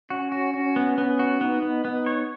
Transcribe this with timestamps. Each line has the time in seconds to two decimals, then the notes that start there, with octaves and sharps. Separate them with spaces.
0.10 C#4 F#4
0.32 F#4
0.54 C#4 F#4
0.76 B3
0.97 B3 C#4
1.19 F#4
1.41 B3 D#4
1.62 B3
1.84 B3 D#4
2.06 C#5